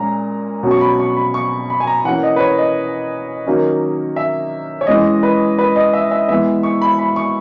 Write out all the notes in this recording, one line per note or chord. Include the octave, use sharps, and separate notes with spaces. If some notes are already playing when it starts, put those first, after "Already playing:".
Already playing: A#2 G#3 C#4 A#5
B2 F#3 C#4
C#6
B5
C#6
B5
C#6
B5
G#5
A#5
E3 A#3 C#4 F#5
D#5
B4
C#5
D#5
D#3 F#3 A#3 C#4
E5
C#5
E3 G#3 C#4 D#5
B4
B4
D#5
E5
E5
E3 G#3 B3 E5
C#6
B5
B5
C#6